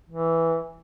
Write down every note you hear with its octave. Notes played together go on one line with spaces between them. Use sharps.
E3